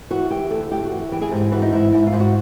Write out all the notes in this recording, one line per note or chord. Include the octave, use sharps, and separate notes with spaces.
E3 F#4
E3 G4
D2 A4
D2 G4
F#4
E3
E3 G4
G#4
G#2 G4
E3 F#4
D#4
G#2 E4
G#2 E4
F4
G#2
F#4